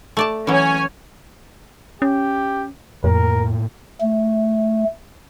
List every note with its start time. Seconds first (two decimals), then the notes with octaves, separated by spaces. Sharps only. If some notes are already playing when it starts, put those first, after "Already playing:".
0.17 A3 D5 A5
0.47 E3 F#3 C#4 C#5 G#5
2.02 C#4 G4
3.04 F2 A2 A#3 A#4
4.01 A3